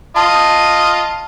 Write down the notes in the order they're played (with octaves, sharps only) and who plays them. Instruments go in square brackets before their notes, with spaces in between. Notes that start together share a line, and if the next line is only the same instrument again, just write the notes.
[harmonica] F4 D#5 [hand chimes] A5